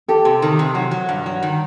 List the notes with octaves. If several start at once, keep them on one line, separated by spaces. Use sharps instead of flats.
G4 A4
C3
D#3
C3
F#3
F#3
G2
F#3
D#3